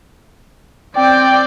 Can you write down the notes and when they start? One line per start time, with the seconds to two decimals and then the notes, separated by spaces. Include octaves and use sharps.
0.96 C4 D5 G5